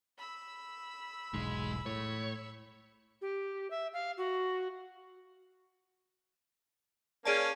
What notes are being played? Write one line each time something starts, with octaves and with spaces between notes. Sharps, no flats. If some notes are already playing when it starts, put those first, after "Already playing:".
B5 E6
E1 B1 G#2 G#3
A2 C#5
G4
E5
F5
F#4
A#3 C#4 G#4 D5 A5